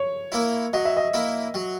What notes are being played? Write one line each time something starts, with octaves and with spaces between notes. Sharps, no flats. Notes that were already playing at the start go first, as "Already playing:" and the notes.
Already playing: C#5
A#3 E4
F#3 D#5
E5
D#5
A#3 E4
F#3